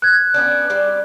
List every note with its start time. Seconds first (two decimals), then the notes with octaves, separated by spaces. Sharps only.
0.02 F#6 G#6
0.34 B3 C#4 D4
0.70 G3 C4 D5